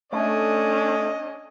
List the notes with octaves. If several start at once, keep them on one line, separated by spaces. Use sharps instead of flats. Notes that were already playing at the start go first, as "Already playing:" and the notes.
A3 C#4 D4 D#5